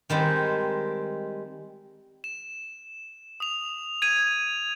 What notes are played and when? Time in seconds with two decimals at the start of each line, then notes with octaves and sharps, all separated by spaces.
0.10 D#3 G3 G#3 C4
2.24 E7
3.40 D#6 F7
4.02 G#6 D#7 F7